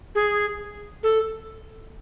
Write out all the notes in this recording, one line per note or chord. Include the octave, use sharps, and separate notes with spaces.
G#4
A4